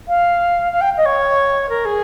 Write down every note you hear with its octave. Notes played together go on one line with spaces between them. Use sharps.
F5
F5
G5
D#5
C#5
A#4
G#4